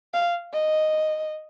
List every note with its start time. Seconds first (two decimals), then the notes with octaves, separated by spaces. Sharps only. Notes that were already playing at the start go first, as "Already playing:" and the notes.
0.13 F5
0.53 D#5